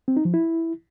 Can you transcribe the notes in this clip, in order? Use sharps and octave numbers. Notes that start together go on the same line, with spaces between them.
C4
D#4
F3
E4